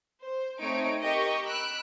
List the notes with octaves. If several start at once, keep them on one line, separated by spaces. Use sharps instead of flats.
C5
A3 C4 D#4 C#5 D7
G4 A#4 D#5 G5 C#6
B5 E6 F#6 D7